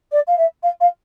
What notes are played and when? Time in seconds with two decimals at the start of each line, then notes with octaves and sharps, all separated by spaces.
0.12 D5
0.27 F5
0.38 E5
0.63 F5
0.80 F5